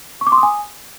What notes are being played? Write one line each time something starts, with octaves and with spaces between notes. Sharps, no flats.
C#6
D6
C6
D#6
G#5